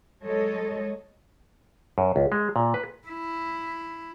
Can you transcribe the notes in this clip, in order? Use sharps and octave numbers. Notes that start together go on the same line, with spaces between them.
F#3 G#3 A4 C#5 D#5
F#2
C#2
G#3
A#2
B4
E4